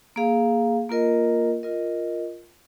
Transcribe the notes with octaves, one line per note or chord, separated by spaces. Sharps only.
A#3 G#4 F5
A#3 F4 A#4 D#5
F4 A#4 D#5